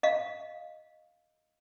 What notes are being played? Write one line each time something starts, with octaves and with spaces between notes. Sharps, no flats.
D#5 F5